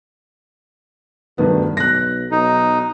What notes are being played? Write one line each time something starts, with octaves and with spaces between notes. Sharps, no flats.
D2 G2 D#3 B3
B1 F#6 A#6
B1 D#4